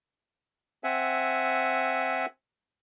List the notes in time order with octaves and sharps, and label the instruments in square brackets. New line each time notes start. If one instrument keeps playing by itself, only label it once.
[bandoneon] C4 E5 F#5 G#5